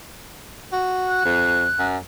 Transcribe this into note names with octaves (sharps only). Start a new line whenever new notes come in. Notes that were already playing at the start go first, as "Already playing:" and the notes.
F#4
F#6
F2
F#2